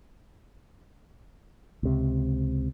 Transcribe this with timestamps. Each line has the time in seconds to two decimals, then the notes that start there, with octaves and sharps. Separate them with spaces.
1.83 C#2 C3